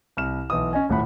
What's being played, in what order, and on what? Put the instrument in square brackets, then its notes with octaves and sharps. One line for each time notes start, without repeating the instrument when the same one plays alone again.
[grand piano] C2 F6 E7
B1 E3 D#6
C#4 D#5 G#5
D#1 A2 F#5 B5